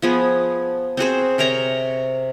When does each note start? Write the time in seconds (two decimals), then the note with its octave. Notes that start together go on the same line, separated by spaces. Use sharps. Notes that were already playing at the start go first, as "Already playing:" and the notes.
0.02 F3 B3 G#4
0.97 C4 F#4 G#4 C5
1.38 C3 A#4 C#5 A#5